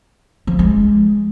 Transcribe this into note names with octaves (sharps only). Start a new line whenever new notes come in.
F3
G#3